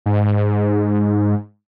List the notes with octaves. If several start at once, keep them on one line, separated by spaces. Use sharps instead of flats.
G#2